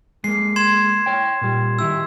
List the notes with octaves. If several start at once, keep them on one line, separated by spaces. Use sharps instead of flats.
G#3 A#3 C7
C6 G#6 E7
C#5 G5
A#2 G3
D#3 E4 G4 E6